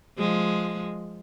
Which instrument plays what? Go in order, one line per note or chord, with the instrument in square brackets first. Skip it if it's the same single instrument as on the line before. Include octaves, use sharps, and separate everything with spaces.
[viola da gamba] F3 G#3